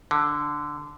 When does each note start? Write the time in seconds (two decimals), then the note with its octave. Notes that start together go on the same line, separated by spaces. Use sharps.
0.11 D3